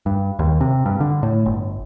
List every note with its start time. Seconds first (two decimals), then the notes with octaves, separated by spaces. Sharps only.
0.06 G2
0.39 D#2
0.61 C3
0.86 G2
1.00 D3
1.23 A2
1.46 G1